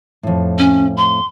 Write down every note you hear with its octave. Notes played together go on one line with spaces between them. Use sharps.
F2 A2
C#4
C6